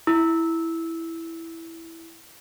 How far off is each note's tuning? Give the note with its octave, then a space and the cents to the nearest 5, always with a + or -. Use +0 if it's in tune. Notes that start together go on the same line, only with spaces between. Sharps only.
E4 +0 E6 -15